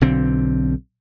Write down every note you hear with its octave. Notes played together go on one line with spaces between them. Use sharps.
B1 D3 C4